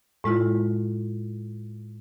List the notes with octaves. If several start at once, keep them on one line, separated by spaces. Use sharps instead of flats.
A2 G#3 E4 F4